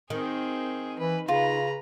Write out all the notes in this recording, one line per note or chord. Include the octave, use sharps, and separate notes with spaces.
D#3 C4 G#4
E3 B4
C#3 F4 B4 A#5